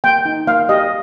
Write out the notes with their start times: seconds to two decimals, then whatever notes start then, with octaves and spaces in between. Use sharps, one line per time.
0.04 A#3 G5
0.25 D#4
0.47 A#3 F5
0.69 G4 D#5